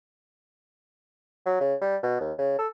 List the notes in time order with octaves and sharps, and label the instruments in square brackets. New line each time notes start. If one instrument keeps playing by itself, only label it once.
[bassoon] F#3
C#3
G3
B2
D#2
C#3
A4